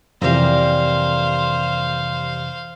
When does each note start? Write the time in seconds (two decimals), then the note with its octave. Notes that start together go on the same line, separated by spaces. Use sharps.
0.22 F2 C3 E3 G3 A#3 C5 F5